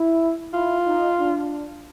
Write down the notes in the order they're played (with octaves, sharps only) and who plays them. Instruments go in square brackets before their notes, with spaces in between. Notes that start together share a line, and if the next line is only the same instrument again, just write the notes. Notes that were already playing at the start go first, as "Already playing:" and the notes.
Already playing: [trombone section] E4
[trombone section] E4 [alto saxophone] F4
[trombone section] D#4
D4